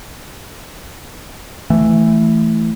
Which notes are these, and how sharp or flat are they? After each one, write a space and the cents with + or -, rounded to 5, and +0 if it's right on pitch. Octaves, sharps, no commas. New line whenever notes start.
E3 +0 A3 +0